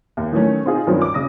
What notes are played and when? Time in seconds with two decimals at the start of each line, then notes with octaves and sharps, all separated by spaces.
0.17 D#2
0.32 D#3 E3 F#3 A3 C#4
0.66 C4 D#4 F4 G#4
0.87 G2 D#3 F3 F#3 C4 C#4
1.02 D6
1.14 C#3 D#6 A#6